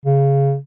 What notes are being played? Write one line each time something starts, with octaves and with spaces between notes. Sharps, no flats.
C#3